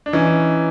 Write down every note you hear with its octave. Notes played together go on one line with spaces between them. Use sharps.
D4
E3 C#4 D#4